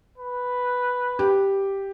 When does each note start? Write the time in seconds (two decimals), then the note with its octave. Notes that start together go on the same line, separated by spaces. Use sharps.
0.18 B4
1.19 G4